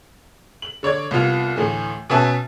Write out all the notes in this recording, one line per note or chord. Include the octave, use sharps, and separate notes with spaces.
F#7
D3 C#5 D5 G#6
C2 B3 F4 F7
D2 A2 E3
B2 C#4 B4 E5 G#5 A5